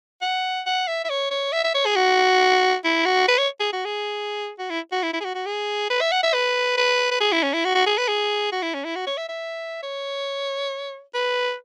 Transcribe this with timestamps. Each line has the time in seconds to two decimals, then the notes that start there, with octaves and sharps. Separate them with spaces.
0.22 F#5
0.66 F#5
0.88 E5
1.05 E5
1.09 C#5
1.30 C#5
1.52 E5
1.64 E5
1.74 C#5
1.85 G#4
1.96 F#4
2.84 E4
3.05 F#4
3.28 B4
3.38 C#5
3.60 G#4
3.73 F#4
3.85 G#4
4.59 F#4
4.70 E4
4.92 F#4
5.03 E4
5.13 E4
5.20 G#4
5.24 F#4
5.35 F#4
5.46 G#4
5.90 B4
6.01 E5
6.11 F#5
6.23 E5
6.33 B4
6.77 B4
7.11 B4
7.20 G#4
7.32 E4
7.43 C#4
7.53 E4
7.65 F#4
7.75 F#4
7.86 G#4
7.98 B4
8.08 G#4
8.52 F#4
8.62 E4
8.74 C#4
8.84 E4
8.95 F#4
9.07 C#5
9.17 E5
9.29 E5
9.83 C#5
11.14 B4